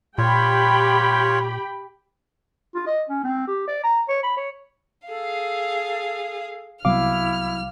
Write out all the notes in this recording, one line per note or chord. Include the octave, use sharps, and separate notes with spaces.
A#2 F4 G4 C#5 G5 B5
F4
D#5
C#4
C4
G4
D5
A#5
C#5
B5
C#5
G#4 A4 F5
C2 F#3 B3 E4 F5 D6 F6